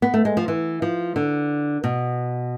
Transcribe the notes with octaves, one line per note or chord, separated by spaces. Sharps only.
B3
A3
G#3
F3
E3
F3
D3
B2